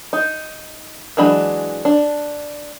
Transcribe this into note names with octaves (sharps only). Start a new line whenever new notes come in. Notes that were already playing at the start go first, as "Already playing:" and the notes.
D#4
E3 F#3 G#3 D4 B5
D4